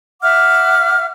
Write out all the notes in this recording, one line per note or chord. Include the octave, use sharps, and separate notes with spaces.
E5 F#5 D6 F6